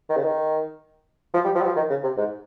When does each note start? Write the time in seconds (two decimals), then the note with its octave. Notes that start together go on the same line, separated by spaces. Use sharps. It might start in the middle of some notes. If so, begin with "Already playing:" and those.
0.09 D#3
0.17 C#3
0.24 D#3
1.34 F3
1.44 G3
1.55 F3
1.61 G3
1.65 F3
1.76 D#3
1.90 C#3
2.03 C3
2.17 G#2